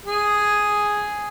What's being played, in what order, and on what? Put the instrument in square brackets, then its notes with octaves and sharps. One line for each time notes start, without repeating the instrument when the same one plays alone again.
[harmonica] G#4